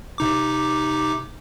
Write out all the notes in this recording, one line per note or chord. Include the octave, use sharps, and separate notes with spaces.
C3 D#4 D6